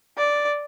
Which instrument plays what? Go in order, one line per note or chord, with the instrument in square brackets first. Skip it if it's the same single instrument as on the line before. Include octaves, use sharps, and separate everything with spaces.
[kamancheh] D5